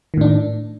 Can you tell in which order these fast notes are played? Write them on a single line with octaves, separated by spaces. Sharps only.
D#3 A2 D4